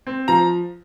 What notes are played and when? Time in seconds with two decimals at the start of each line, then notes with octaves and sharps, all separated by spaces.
0.07 C4
0.28 F3 A#5